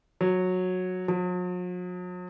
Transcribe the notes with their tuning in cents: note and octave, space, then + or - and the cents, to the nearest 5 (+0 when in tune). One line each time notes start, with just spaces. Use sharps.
F#3 -10
F#3 -45